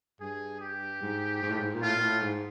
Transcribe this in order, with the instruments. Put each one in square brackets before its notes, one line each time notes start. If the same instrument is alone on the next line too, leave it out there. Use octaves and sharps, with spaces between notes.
[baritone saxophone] G2 [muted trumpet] G#4
[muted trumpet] G4
[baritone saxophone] G#2
G#2
A2
G#2
A#2
[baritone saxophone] A2 [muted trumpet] F4
[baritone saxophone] A#2
A2
G#2